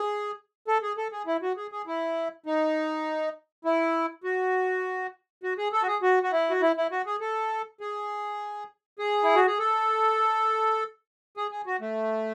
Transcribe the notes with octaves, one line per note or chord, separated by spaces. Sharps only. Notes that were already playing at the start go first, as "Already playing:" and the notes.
Already playing: G#4
A4
G#4
A4
G#4
E4
F#4
G#4
G#4
E4
D#4
E4
F#4
F#4
G#4
A4
F#4
G#4
F#4
F#4
E4
F#4
E4
E4
F#4
G#4
A4
G#4
G#4
E4
F#4
G#4
A4
G#4
G#4
F#4
A3